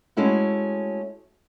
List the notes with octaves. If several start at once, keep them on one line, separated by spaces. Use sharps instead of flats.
G#3 A3 C#4 E4 F#4